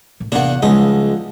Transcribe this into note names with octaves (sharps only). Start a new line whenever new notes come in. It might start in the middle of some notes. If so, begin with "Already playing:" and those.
A2 D#3
E2 A2 C3 A#3 D4 F#5
C#2 C#3 F3 G3 G#3 D#4